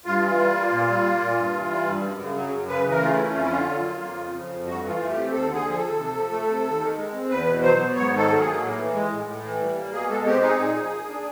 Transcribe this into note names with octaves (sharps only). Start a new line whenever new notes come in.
G2 F4
E3
G3
A#3
A#2
G3
A#3
A#2
G2
E3
G3
G2
F#2
C#3
F#3
F#2
C#3 B4
E3
A#4
A3 F4
E4
C#4
F2 F4
E4
D3 F4
F#3
A#3
F2
C#3
F3
F2
G2 F#4
E3
F4
A3
G4
C4
D#2 A4
D3
G#4
F3
G#4
A4
D#2
C3
F3
A3
C3
D#2
D#3
G#3
C4
E2 B4
B2
F#3 C5
B3
G#2 C#5
D#3 A4
F#3
G#4
A#3
A2
E3
G#3
A2
A2
E3
G3
A#3
B2 G#4
G#3 A4
C4 G4
D#4 G#4
A#2 G#4
F3
A#3
D4